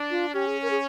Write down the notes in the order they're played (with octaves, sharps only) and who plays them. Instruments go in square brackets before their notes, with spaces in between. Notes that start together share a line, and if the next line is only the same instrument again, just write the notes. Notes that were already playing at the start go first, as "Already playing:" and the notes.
Already playing: [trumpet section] D4
[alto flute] F4
[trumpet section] C#4 [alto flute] G4
[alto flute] G#4
A#4
G#4